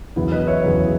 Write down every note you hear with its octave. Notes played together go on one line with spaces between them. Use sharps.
E2 C#3 F#3 B3 E4
B4 D#5
C#5 E5
E2 C#3 F#3 B3